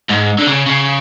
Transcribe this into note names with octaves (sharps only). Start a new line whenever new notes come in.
G#2
D3
C#3
C#3